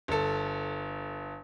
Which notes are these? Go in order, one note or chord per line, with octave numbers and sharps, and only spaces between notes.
G1 A4